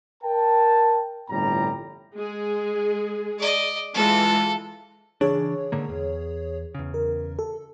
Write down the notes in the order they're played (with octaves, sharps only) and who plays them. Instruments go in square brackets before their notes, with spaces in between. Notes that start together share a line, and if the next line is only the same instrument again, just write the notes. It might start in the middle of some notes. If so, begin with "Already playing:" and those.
[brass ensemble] A#4 G5 A5
G1 C2 F2 A2 G3 A#5
[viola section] G#3 G#4
[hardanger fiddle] D5 D#5
[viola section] E3 G#3 F4 [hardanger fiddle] A4
[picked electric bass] C#3 E3 D4 [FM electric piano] G#4 C#5
[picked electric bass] G#2 D3 A#3
E2
E2 C#3
[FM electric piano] A#4
A4